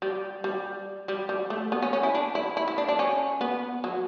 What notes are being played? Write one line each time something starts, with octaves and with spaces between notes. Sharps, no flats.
G3
G3
G3
G3
A3
B3
C#4
C#4
E4
D4
E4
E4
E4
D4
D4
C#4
B3
F#3